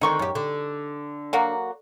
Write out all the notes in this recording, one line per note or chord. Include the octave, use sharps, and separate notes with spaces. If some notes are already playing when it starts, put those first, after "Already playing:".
D3 D#3 C4 D#4 C#6
F#2 G4
D3
F#3 A#3 F#4